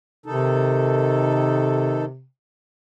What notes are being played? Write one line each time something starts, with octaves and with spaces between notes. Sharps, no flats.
C3 D#3 D#4 A4